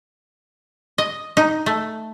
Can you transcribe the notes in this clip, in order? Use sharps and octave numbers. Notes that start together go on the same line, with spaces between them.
D#5
D#4
A3